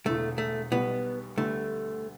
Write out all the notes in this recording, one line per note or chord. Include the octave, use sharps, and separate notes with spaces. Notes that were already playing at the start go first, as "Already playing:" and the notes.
E1 E2 D3 A3
A3
B1 B2 G3 B3
D2 D3 G3 A3 B3